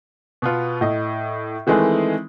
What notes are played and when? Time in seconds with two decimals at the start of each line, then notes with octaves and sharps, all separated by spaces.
0.42 B2 B3 F4
0.81 A2 D#5
1.67 D#3 E3 G#3 A3 C4 G#4